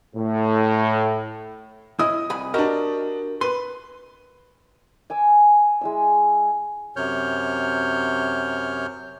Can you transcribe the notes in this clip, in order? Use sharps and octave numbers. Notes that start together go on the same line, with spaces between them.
A2
E4 D#5 D#6
C2 G#5 B5
D4 F#4 G4 A#4 D#5
B4 C6
G#5 D6 E6
G#3 E4 E6
F#2 C3 C#5 F6 G6